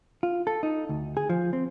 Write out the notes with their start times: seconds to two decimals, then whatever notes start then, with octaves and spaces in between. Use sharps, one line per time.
0.23 F4
0.47 A4
0.63 D#4
0.89 D2
1.17 G#4
1.29 F3
1.53 C4